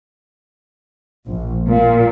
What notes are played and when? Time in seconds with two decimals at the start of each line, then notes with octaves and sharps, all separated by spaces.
1.28 A#1
1.69 A#2